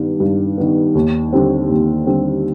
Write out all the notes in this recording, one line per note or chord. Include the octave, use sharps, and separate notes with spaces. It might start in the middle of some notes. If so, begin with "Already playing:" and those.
Already playing: G2 D#3 B3
G2
D#3 B3
D#2
D3 G3 C4
D#2
D3 G3 C4